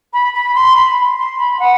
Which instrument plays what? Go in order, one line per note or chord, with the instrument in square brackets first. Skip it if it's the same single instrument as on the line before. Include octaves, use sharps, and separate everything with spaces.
[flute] B5
B5
C6
B5
C6
B5
F#5